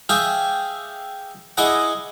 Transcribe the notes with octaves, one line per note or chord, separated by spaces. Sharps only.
G4 G#4 E5 F5
E4 G#4 D#5 F#5 D6